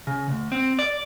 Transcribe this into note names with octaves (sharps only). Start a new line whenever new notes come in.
C#3
D2
C4
D5